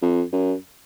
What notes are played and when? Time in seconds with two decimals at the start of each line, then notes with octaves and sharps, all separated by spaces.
0.02 F2
0.33 F#2